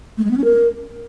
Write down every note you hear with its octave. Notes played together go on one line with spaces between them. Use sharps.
A3
G#3
B3
C#4
A#4